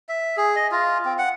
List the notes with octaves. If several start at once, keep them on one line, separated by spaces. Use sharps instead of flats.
E5
G#4
D#5
F4
C4
F#5